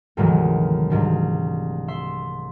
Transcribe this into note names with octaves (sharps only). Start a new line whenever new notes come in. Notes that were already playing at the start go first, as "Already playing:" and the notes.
D2 G#2 C3 D#3 E3 F#3
C2 G#2 D4
E5 C6